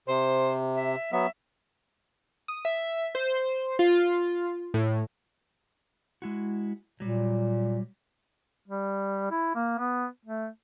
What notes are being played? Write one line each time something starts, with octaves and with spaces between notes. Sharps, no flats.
C3 C5
E5
F#3 B3 E5
D#6
E5
C5
F4
A2
G#3 E4 F#4
A#2 F#3 G3
G3
E4
A#3
B3
A3